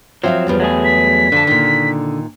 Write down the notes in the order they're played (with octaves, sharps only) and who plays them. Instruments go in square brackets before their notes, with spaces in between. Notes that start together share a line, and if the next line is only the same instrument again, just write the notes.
[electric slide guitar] F3 F#3 [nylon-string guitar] C4 E5 F5
[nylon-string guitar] E2 G3 B3
[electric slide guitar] F#3 A3 G#4
[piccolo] B6
[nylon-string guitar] F2 A5 [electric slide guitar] D3
[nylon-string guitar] A#2 D#3